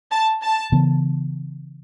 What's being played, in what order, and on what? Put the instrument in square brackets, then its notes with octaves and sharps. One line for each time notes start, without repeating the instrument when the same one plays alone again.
[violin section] A5
A5
[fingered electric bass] C#3 E3 B3